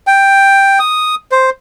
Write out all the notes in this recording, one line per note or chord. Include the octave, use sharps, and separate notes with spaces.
G5
D#6
C5